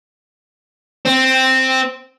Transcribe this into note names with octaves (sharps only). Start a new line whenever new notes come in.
C4